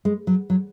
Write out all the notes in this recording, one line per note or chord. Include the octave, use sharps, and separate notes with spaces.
G#3
F#3
F#3